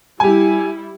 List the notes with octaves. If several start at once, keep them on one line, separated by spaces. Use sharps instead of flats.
G3 E4 G4 G#5